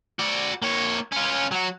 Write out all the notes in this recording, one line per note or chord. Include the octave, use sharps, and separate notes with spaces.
F#4 D5
A#3 C#5
C#4 F4
F#3 F#4